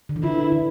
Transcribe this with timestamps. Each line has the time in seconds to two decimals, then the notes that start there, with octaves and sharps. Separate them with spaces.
0.09 D3
0.16 E3
0.23 D3 E4
0.52 D3